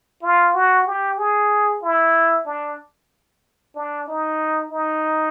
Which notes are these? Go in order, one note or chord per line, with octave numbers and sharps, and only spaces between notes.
F4
F#4
G4
G#4
E4
D4
D4
D#4
D#4